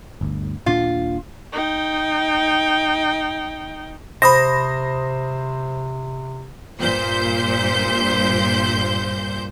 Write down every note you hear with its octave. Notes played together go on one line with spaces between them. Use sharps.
G1 D2
D#1 A#2 D4 F4
D#4 G5
C3 C5 B5 D#6 A#6
G2 A#2 C5 G6